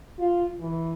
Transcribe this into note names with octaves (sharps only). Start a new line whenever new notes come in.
F4
E3